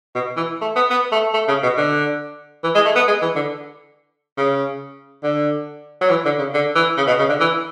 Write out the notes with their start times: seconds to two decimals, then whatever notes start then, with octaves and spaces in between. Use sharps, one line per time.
0.15 B2
0.37 E3
0.61 A3
0.76 B3
0.90 B3
1.12 A3
1.34 A3
1.48 C#3
1.63 B2
1.77 D3
2.64 E3
2.75 G#3
2.85 A3
2.96 B3
3.08 G#3
3.22 E3
3.36 D3
4.38 C#3
5.23 D3
6.01 F#3
6.10 E3
6.25 D3
6.39 C#3
6.54 D3
6.75 E3
6.97 C#3
7.07 B2
7.19 C#3
7.29 D3
7.40 E3